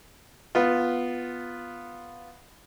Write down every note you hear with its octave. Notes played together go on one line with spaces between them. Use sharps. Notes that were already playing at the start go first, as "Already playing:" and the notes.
B3 F4